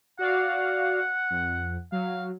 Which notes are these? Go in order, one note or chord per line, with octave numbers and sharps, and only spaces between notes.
F#4 D5 F5 F#5
F2
F#3 F5